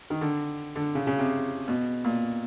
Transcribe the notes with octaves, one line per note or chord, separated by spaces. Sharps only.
D#3
D3
D3
C#3
C#3
C3
B2
A#2